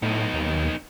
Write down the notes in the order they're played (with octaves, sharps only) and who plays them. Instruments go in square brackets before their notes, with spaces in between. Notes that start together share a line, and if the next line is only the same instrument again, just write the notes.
[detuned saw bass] A2 [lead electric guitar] B3 D#4
[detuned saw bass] D#2